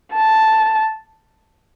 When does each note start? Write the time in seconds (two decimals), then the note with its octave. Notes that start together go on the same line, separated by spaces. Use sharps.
0.13 A5